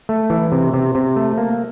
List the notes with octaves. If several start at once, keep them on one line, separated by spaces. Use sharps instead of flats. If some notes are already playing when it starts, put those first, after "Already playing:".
A3
E3
C3
C3
C3
A3
A#3